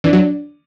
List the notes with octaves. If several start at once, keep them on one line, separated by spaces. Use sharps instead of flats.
E3 D4
F#3